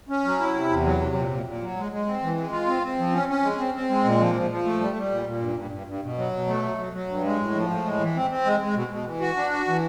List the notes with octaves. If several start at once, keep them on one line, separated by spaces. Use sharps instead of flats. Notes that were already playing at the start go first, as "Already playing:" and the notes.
C#4
F#3
E4
C3
E2
F#3
C3
A#2
A#2
A#2
F#3
G#3
G#3
C4
E3
G#3
F4
C4
C4
F3
C#4
C#4
G#3
C4
C4
G#3
A#2
F3
F3
F3
A3
G3
G3
A#2
A#2
G2
G2
G2
G2
B2
F#3
B2
A3
F#3
F#3
F#3
G2
G#3
A2
F3
A2
G#3
E3
C4
C4
G#3
G#3
B2
B2
E3
F#4
D4
F#4
E3